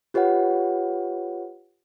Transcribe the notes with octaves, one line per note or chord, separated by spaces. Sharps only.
F4 G4 B4 C#5 F#5